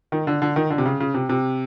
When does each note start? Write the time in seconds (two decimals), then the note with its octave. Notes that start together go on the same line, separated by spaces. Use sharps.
0.12 D#3
0.27 D3
0.42 D3
0.56 D#3
0.70 D3
0.78 C3
0.85 C#3
1.00 C#3
1.14 C3
1.29 C3